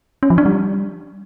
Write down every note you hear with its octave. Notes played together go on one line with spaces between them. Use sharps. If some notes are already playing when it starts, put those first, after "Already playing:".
C#4
F3
D4
G3